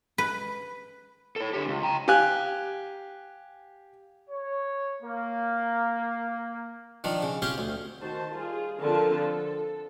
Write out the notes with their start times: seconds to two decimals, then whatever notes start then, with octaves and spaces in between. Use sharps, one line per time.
0.18 B4
1.36 A4 C#5
1.54 D3 G4
1.68 C#2
1.83 G5 A#5
2.08 G4 F5 G#5 F#6
4.30 C#5
5.02 A#3
7.04 D#3 F3 D4
7.22 C#3
7.42 C4 C#4 F4 G4 G#4
7.58 D2
8.01 D#3 F#4 C5 A5
8.31 G3 F4 G#4
8.80 D3 F3 C4 F4 A#4 A5
9.18 A4